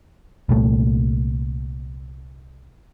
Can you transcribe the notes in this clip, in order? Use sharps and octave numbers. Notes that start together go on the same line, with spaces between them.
C2 A#2 A3